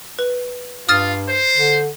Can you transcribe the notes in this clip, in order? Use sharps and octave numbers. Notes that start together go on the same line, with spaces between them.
B4
G2 F4 D#6 F6 A6
C5
D3